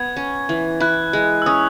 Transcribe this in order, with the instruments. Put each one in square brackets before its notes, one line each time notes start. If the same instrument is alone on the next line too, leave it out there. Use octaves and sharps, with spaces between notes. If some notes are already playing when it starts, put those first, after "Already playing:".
Already playing: [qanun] B3 B4 [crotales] G#6
[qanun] C#4
E3
[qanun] E4 [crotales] F#6
[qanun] G#3
[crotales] E6
[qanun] C#4 [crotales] D#6